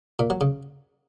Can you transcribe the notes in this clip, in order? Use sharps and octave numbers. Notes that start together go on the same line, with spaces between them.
A#2
F#3
C#3